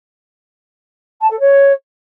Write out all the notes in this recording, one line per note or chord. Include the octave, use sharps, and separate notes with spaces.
A5
A4
C#5